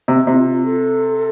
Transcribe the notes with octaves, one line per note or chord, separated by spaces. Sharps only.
C3
C3 E4
F4
A4